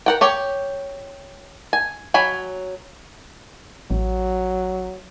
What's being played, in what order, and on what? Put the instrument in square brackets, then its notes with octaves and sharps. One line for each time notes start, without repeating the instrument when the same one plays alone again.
[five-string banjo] A#4 F#5 G5
G4 C#5 G5
G#5
F#3 G#5 B5
[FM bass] A1 [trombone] F#3